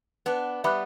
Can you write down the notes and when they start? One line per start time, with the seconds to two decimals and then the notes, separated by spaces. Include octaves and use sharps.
0.26 B3 D4
0.64 G3 B3 E5 B5 D6 F#6